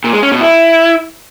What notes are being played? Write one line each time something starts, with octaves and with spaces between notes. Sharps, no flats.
A#2
G#3
C#4
B2
E4